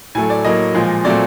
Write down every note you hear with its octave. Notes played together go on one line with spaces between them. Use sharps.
A2 F#3 A3 G#5
D5
A2 F#3 A#3 D#5
A#2 F3 G#3
A#2 F#3 A3 C4 D5